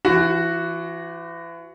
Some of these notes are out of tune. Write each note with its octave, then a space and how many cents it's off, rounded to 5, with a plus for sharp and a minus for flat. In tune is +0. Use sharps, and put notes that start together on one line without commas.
E3 +35 F#4 +0